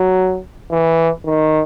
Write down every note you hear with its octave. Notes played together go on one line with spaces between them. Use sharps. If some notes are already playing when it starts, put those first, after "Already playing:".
Already playing: F#3
E3
D#3